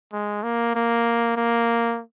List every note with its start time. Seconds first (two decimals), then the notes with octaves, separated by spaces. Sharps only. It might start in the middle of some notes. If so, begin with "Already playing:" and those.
0.13 G#3
0.43 A#3
0.75 A#3
1.37 A#3